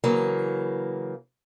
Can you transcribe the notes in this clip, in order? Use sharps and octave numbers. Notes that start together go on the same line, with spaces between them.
C#3 E3 F#3 A#3